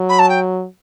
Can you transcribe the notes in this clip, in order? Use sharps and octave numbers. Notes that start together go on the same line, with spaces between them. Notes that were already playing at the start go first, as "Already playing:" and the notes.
Already playing: F#3
B5
A5
G5